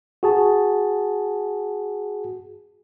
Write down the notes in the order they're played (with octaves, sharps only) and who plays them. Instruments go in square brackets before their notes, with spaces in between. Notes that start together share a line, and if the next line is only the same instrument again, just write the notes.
[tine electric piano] F#4 G#4 A5